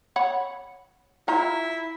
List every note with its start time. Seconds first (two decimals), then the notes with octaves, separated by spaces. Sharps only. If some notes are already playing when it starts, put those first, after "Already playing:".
0.16 C#5 F#5 B5
1.28 E4 F4 A#5